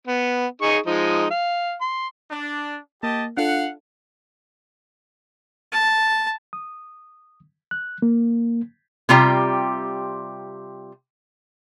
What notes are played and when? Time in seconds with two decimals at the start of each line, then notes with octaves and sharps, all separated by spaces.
0.07 B3
0.62 D#4 G#4 C#6
0.86 F3 G#3 D#4
1.30 F5
1.81 C6
2.31 D4
3.03 A#3 G4 D#5 A5
3.37 D4 F4 A4 F5 F#5
5.72 A5
6.53 D#6
7.71 F#6
8.02 A#3
9.09 C3 G3 F4 G4 G5 A#5